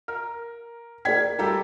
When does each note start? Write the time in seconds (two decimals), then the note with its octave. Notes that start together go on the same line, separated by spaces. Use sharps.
0.08 A#4
1.05 A#4 D5 G5 G#6 B6
1.39 G3 G4 A4 A#5